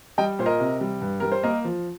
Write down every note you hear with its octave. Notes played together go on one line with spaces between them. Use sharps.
G3 D#5 G5
A#2 C5
A#4 D#5
C3
G3
G2
G3 A#4
C5
A#3 A#4 D#5
F3